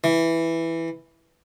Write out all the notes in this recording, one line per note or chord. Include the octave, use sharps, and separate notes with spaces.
E3